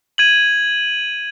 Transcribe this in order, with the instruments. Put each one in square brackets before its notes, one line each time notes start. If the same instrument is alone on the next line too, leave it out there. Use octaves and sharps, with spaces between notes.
[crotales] G#6 D#7 F#7